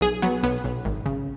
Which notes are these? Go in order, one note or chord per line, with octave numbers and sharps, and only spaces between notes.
B1 G#4
F#3 B3
B1 B3
B1
G#1
C#3